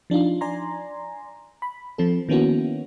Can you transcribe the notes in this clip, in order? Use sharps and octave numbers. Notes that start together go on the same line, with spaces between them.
F3 D4 D#4 F4
D5 G#5 A#5 C6
B5
F3 C4 A4
D#3 A#3 B3 C#4 E4 F#4